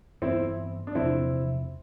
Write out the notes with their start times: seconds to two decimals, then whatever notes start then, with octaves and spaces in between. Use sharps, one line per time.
0.22 G2 E3 B3 C4 E4
0.87 D4
0.95 E2 C3 F3 C4 E4